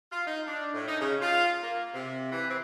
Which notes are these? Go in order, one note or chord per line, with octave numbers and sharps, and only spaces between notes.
F4
D#4
D4
A2
D#4
C#3
F4
A#3
C3
E3
C4